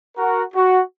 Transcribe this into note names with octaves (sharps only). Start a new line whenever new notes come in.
F#4 A#4
F#4